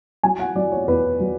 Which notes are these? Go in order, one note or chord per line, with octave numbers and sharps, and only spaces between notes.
F#3 G#5
F#5
F#3 D5
C#5
E2 B4
F#3